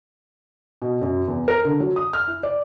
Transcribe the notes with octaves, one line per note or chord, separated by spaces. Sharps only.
B2
F#2
E2
A#4
D3
F#3
D#6
F6
E4
D5